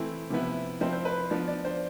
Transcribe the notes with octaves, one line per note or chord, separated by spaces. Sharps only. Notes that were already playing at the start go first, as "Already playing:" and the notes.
Already playing: E3 A3 C4 E4
C3 F3 B3 E4
F3 C4 E4 C5
C5
B4
C5
F3 B3 D4 D5
D5
C5